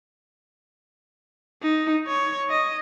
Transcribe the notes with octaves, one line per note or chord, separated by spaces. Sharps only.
D#4
C#5
D#5